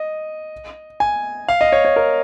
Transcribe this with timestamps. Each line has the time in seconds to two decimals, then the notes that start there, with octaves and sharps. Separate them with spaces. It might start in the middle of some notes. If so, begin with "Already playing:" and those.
Already playing: D#5
1.00 G#5
1.48 F5
1.61 D#5
1.72 C#5
1.85 C#5
1.96 A#4